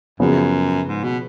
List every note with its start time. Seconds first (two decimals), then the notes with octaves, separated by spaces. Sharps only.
0.20 F#2 C#3 F3 B3 F#4
0.87 G#2
1.04 B2